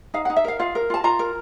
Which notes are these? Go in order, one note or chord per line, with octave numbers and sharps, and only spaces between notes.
D#4 F5
D#4 F#5
E5
A#4 F5
F4 F5
A#4
F4 A5
F4 A#5
A#4